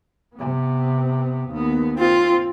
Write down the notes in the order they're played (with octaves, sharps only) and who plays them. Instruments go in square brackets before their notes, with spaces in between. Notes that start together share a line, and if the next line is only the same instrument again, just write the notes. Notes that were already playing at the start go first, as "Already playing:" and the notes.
[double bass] C3 B3
D#2 B3
[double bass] C4 [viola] F4